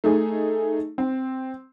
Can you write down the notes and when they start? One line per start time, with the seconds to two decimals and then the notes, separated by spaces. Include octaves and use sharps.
0.04 A3 D#4 G#4
0.98 C4